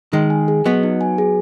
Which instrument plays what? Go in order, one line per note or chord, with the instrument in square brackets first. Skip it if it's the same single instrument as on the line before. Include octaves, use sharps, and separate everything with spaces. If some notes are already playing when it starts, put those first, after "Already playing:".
[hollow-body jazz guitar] D#3 G#3 [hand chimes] D#4
[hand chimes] G#5
G#4
[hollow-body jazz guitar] F#3 B3 [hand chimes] D#5
[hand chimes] D#4
G#5
G#4